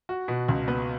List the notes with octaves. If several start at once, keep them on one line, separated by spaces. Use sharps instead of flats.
F#4
B2
C#2
B3